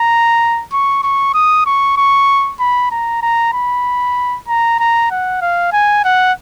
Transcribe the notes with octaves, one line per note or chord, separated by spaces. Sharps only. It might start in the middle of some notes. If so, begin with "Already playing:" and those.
Already playing: A#5
C#6
C#6
D#6
C#6
C#6
B5
A#5
A#5
B5
A#5
A#5
F#5
F5
G#5
F#5